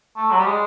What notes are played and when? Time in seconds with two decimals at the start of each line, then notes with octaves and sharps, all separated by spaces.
0.16 A3
0.31 F#3
0.40 G3
0.46 G#3